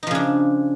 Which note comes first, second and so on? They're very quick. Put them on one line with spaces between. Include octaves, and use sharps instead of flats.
D#4 F3 C#3 D4